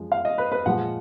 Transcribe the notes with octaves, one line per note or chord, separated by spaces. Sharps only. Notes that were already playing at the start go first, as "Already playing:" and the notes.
Already playing: F#2 F3 G#3
F5
D#5
B4
B4
A#2 F3 G#3 F#5